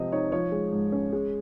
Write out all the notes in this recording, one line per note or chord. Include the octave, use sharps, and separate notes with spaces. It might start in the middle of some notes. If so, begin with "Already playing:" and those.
Already playing: C3 F3 C4 D#5
D#4 C#5
F3 C#5
G#3
G#2
C#4
G#3